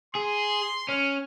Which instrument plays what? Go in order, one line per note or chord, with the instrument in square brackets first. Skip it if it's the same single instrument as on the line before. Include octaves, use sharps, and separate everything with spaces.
[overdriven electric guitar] G#4 [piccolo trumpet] C6
[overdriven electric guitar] C#4 [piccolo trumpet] F6